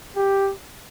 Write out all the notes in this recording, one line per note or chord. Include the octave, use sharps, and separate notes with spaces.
G4